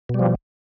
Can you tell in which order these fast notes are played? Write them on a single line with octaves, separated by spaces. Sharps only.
B2 G3 F3